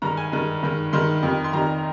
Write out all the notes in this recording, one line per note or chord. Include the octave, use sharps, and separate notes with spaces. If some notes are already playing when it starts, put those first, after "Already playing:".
G2 D#3 G#3 A#5
G#5
G2 D#3 G#3
G2 D#3 G#3
G2 D#3 G#3 C6
F2 D#3 G3
C6
F2 D#3 G3 A#5